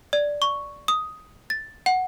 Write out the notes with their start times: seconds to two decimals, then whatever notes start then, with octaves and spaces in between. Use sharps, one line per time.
0.13 D5
0.42 C#6
0.88 D#6
1.50 A6
1.86 F#5